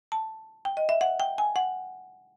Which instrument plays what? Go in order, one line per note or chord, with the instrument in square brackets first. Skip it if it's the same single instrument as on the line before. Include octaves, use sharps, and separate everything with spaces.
[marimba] A5
G5
D#5
E5
F#5
G5
G#5
F#5